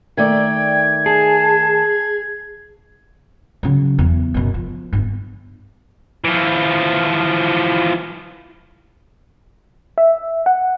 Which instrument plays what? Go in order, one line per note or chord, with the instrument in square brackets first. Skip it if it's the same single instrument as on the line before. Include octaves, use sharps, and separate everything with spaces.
[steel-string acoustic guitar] D#3 A3 D5 [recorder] G5 [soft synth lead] G#6
[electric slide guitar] G#4 [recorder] A5
[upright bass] C#3 F#3
E2
F#2 B2
F3
G1
[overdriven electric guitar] E3 F3
[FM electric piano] E5
F#5